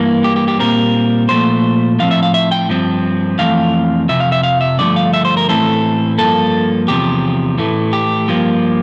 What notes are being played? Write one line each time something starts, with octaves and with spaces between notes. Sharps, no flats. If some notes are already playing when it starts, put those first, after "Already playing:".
Already playing: G2 E3 A#3
G4
G4
G4
A#2 G3 C4 A#4
A#2 F3 A3 C5
A2 F3 C4 F5
E5
F5
E5
G5
G2 F3 C4
F2 E3 A3 C4 F5
F2 C3 F3 E5
F5
E5
F5
E5
G2 D3 F3 A3 D5
F5
E5
C5
A#4
A2 E3 A3 C4 A4
G2 F3 A#3 A4
E2 C3 F3 G4
A2 E3 A3
G4
G2 F3 A#3